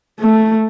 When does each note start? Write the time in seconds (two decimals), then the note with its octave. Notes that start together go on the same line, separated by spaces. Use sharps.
0.20 A3